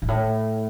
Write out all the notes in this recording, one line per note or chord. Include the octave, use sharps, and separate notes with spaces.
G#2
A2